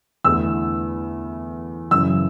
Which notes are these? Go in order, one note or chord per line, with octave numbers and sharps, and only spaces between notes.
E2 D3 A3 E4 E6
F#2 C#3 E3 E6